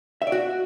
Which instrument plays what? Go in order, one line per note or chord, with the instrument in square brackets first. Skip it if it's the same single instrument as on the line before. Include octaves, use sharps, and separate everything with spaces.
[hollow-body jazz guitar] E5
D5
F#4